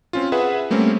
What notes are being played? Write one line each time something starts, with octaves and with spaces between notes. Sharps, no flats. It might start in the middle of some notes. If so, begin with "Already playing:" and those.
C4 C#4 F4
G#4 B4 E5 F#5
G3 A3 A#3 C4 C#4